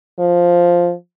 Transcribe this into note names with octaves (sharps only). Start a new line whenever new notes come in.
F3